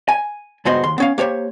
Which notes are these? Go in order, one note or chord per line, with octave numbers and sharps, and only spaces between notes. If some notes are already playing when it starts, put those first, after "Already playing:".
G#5
C#2 G2 B3 F#4 C5 D#5
D#2 C6
B3 C#4 F5
A#3 G4 C5 C#5